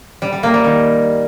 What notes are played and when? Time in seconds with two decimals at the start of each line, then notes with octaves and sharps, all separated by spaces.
0.22 G3
0.33 G3
0.43 A#3
0.54 G3
0.64 D#3